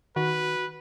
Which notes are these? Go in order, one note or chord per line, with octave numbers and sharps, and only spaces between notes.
D#3 F#4 B4